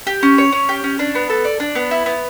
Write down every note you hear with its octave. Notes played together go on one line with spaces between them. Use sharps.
G4
C#4
C#5
C#4
G4
C#4
D4
B3
A4
D5
D4
B3
E4
B3